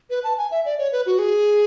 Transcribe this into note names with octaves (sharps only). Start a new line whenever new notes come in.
B4
A5
G#5
E5
D5
C#5
B4
F#4
G#4